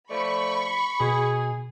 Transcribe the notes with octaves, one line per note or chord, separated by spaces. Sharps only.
F3 A3 D5 B5 C#6
B2 G#4